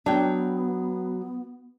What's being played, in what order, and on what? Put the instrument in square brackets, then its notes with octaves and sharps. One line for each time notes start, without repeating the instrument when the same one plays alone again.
[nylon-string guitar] F#3 G5 [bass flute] B3 [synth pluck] D4